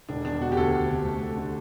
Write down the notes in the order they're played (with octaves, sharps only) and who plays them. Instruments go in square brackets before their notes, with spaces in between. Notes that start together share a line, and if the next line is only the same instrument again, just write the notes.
[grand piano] E1 [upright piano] D4
[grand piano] E2 [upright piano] D4
[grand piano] B2 [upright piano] F#4
[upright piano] G4
[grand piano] D2 [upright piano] A4
[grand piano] D2
C3
A3
A3
D3